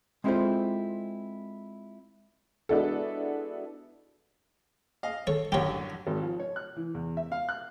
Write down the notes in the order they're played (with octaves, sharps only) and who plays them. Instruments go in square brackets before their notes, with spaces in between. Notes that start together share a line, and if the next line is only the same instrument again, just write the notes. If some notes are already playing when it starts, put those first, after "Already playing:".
[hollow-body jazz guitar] G#3 C4 E4 F4 A4 C5
[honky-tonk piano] G#3 B3 D4 E4 F#4 A4
[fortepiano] D#5 F5
[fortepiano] A4 [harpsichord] C#5
[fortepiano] A1 F#2 D3 [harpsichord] G4 C#5
[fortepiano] G#1
F3
C#5
F#6
E3
E2
E5
F5
F#6